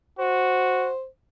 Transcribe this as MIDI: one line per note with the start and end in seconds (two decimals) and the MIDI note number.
0.19 0.92 66
0.19 1.06 72